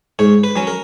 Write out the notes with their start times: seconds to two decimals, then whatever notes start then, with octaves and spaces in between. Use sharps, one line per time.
0.19 G#2 C#5
0.44 B4
0.56 F#3 C#4
0.67 A#4